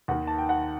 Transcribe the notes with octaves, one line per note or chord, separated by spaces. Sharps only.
D#2 D#3 F#5
A5
G5
F#5